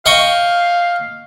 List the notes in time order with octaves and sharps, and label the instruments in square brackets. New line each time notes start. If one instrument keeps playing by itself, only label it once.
[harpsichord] D#5 G5 C#6 [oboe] F5